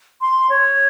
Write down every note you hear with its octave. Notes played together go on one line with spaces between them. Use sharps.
C6
C#5